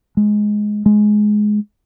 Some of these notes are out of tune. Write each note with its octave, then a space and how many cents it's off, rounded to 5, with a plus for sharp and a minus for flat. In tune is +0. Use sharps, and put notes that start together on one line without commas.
G#3 +10
G#3 +15